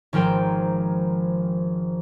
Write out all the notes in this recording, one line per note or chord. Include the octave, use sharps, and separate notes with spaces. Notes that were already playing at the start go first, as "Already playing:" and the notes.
G#1 F3 A#4 G5